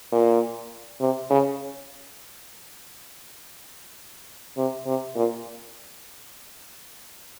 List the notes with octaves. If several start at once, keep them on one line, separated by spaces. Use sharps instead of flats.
A#2
C3
C#3
C3
C3
A#2